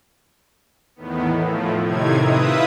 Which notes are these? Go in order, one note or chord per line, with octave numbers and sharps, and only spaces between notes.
E2 A2 D#3 B3
A2 F3
A2 C3 D#3 C4 D#4 G#6
E4 F4 B4 E5 D#6